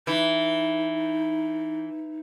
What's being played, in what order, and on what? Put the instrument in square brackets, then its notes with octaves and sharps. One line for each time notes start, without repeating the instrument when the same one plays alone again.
[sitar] E3 [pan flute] D#4